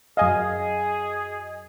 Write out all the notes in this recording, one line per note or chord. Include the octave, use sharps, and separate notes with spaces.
F#2 G#4 D#5 F5 G#5